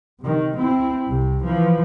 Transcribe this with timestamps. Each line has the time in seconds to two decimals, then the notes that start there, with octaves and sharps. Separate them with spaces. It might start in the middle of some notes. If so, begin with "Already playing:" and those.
0.20 C3 D#3
0.57 C4 E4
1.08 C2 C3
1.44 E3 F3